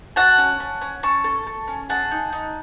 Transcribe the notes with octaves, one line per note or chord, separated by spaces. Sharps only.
F#4 F#5 A5
C#4
C#4
C#4
C#4 A5 C#6
A4
A4
C#4
G#4 F#5 A5
D#4
D#4